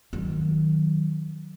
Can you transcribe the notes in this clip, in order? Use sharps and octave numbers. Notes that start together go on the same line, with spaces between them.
D#3 F#3